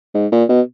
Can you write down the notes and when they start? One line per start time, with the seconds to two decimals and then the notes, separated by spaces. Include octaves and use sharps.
0.15 G#2
0.32 A#2
0.49 B2